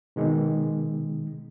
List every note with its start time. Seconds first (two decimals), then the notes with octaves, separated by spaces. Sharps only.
0.16 B2 D#3 G#3